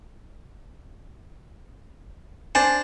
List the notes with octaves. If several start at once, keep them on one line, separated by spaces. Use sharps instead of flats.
D4 C5 G#5